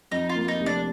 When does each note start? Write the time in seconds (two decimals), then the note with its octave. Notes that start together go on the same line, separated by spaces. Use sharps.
0.11 F2 D#4
0.29 F4
0.36 A#3
0.48 D#4
0.60 F1
0.66 D4